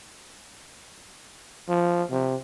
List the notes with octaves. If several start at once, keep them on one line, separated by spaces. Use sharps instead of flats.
F3
C3